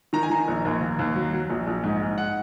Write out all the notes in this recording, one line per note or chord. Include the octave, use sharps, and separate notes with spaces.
D#3 A#5
G#5
D#3 A#5
A#1
D#2
D#2
D#2
F#3
F#3
A#1
A#1
G#2
G#2
F#5